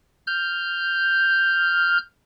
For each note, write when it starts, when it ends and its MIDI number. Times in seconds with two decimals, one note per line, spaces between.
0.27 1.98 89
0.27 1.98 91